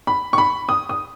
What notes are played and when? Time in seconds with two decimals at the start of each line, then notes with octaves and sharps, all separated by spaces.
0.07 B5
0.33 C#6
0.38 B5
0.69 D#6
0.89 D#6